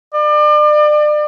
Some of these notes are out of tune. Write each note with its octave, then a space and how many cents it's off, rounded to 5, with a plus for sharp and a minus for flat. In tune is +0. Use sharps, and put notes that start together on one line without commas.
D5 +35